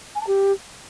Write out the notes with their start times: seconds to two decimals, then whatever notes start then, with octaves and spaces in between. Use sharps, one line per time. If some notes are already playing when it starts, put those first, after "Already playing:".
0.15 G#5
0.21 A5
0.26 G4